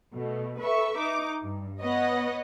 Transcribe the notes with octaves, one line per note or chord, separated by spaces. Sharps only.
B2 A3
A4 B4 E5 C#6
D#4 D6
G2
B3 B4 C#5 D#5 F#5